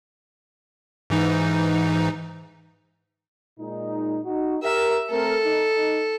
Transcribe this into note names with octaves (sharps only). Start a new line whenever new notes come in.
G#2 E3 D#4
A#2 G#3 D#4
D#4 F#4
G4 A#4 E5
A3 C4 A4 A#4
D#4